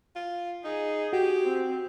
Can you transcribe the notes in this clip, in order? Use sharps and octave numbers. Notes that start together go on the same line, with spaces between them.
F4
D#4 G#4
F#4 G4
C4